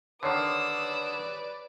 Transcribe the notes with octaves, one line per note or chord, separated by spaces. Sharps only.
D3 D#3 B4 C#5 D5 D#6 E6 C7